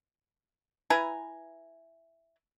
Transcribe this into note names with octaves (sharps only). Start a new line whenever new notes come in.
E4 B4 G#5 A#5